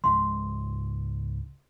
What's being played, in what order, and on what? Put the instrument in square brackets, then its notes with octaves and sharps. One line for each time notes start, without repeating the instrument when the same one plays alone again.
[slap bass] C#2 G#2 G#3 [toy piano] F5 C6